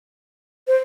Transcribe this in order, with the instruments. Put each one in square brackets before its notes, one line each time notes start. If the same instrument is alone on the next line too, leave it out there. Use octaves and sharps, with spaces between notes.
[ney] C5